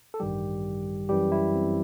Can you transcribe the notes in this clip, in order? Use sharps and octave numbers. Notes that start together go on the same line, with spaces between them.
A4
A1 G2 D#3 G3 G4
F#2 E3 G3 G4
E4
C4